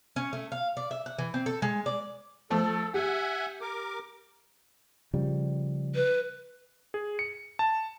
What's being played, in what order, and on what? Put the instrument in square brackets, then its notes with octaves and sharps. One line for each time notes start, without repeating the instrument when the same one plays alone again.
[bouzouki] C#4
A3
F5
D5
E5
F#5
E3
C4
A4
G#3
D5
[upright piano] F3 A3 [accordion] A4
[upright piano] G4 [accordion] E5 F#5 G#5
[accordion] A#4 D6
[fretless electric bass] C#3 F3 G3
[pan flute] B4
[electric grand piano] G#4
C#7
A5